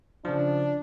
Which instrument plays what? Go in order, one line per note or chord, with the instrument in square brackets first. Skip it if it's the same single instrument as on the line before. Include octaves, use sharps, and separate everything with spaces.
[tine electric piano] C#3 F3 [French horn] D4